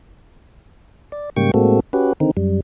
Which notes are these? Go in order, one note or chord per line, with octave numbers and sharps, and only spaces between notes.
D5
G#2 C#3 G3 A#3 G5 C#6
A2 G#3 A#3 C4 F#4 A4
C#4 F#4 G4 B4
D3 D#3 C4 D#4
F#2 G3